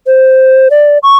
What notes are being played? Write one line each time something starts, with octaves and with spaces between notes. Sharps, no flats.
C5
D5
C#6